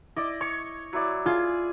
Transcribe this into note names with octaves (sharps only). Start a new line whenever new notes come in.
E4 D5 D#5
C#5 C#6
F#3 E4 D5
F4 G#4